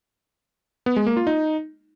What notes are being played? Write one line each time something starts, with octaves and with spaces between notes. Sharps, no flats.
B3
G#3
A#3
F4
D#4